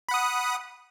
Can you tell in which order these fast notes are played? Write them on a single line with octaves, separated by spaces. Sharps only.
B5 F#5 D#6